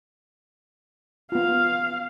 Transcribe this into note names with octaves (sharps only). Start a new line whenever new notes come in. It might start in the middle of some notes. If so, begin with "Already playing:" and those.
B3 F4 F5